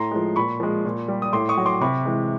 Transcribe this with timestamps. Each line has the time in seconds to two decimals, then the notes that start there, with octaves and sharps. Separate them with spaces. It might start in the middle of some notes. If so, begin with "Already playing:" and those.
Already playing: A2 A#5 C6
0.11 F3 G#3
0.36 A#2 B5 C#6
0.60 F3 G#3
0.85 A#2
1.08 G3
1.22 D#6
1.33 A2 C6 D6
1.49 C#6 D#6
1.57 F#3
1.66 C6 D6
1.81 C3 B5 C#6
2.05 E3 G#3